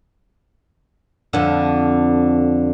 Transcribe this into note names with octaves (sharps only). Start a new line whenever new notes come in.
F2 D3